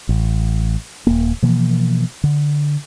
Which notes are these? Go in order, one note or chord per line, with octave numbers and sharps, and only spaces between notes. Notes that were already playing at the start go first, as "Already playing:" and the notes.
A1
D#1 A#3
B2 E3 F3 A#3
D3